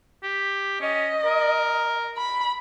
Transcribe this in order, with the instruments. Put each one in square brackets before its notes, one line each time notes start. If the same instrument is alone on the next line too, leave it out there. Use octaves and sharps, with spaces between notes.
[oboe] G4
[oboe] C#4 [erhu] D#5
[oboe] A#4
[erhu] B5